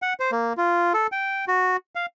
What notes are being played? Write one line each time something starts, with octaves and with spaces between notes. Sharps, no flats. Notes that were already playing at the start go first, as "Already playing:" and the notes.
F#5
C5
A#3
F4
A4
G5
F#4
F5